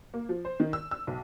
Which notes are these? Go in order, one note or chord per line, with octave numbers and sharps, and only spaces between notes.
A#3
F3
C5
D#3
E6
E6
B1